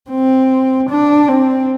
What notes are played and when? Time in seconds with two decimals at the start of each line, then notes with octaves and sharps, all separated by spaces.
0.10 C4
0.90 D4
1.28 C4